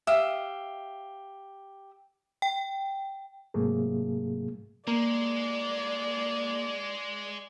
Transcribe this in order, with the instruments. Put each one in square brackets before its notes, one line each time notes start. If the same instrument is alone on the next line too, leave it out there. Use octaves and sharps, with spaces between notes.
[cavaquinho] G4 E5 F5 D#6
[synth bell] G5
[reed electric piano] G#2 C3 F#3 A3 A#3 G#4
[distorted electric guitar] G#3 [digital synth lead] A#3 [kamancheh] D5